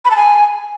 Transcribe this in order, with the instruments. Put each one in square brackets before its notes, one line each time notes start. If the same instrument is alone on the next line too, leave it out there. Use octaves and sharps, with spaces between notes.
[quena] B5
A5
G#5